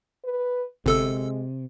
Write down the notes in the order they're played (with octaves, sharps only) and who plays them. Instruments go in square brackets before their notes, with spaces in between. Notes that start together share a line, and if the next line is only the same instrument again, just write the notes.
[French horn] B4
[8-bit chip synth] G1 A4 E6 [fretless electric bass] C3 [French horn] G#3